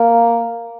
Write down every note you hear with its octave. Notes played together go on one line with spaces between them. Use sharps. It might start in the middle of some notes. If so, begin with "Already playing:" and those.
Already playing: A#3